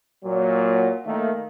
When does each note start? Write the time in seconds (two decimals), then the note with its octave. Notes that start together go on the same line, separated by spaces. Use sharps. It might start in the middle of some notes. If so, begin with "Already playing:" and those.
0.25 A#2 F#3
1.06 D#3 A3 A#3